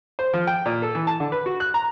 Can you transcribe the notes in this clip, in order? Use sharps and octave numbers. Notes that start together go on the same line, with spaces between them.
C5
F3
G5
A#2
A4
E3
A5
D3
B4
F#4
F#6
A#5